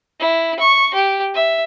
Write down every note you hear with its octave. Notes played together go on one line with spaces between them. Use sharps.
E4
C#6
G4
E5